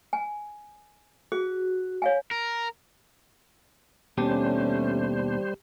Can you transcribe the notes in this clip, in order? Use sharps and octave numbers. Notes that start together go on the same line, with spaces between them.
G#5
F#4 G#4
C#5 F5 G#5
A#4
D#2 B2 G3 A3 C#4 D4 G4 C5